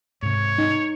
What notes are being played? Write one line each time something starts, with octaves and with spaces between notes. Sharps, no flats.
G#2 C3 C#5
D#4